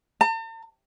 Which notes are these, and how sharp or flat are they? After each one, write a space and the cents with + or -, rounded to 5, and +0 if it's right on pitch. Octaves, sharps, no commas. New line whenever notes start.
A5 +45